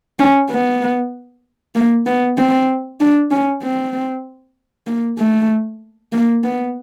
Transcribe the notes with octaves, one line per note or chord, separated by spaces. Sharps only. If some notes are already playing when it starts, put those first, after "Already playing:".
C#4
B3
A#3
B3
C4
D4
C#4
C4
A#3
A3
A#3
B3